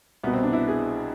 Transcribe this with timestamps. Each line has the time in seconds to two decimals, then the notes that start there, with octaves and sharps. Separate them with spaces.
0.24 C2 B2 B3
0.33 C4
0.43 D4
0.53 E4
0.68 G#4